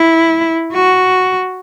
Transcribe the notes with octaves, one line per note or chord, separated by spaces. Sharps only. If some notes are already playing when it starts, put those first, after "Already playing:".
Already playing: E4
F#4